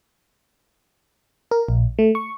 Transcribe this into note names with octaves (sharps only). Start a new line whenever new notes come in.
A#4
A#1
A3
C#6